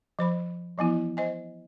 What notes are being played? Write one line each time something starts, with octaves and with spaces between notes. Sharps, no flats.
F3 C5 B5
E3 F3 B3 E4
C5 D#5 G#5